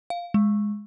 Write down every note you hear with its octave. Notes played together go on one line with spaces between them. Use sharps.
F5
G#3